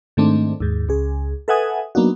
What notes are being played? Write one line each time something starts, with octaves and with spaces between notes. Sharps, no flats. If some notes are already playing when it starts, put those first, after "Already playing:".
G#2 D#3 A3 C4 D4
D#2 G#2
C#2 G#4
A4 B4 E5 F#5 G#5 D#6
F#3 A#3 B3 D4 D#4 F#4